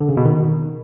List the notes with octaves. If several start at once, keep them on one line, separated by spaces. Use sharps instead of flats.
D3
C#3
B2
D#3